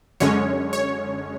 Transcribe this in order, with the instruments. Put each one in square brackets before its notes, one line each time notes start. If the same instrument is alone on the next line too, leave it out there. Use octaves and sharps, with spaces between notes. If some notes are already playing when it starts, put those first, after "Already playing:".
[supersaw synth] F#2 D3 G#3 C#4 C#5
C#5